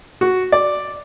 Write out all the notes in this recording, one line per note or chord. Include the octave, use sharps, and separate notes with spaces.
F#4
D5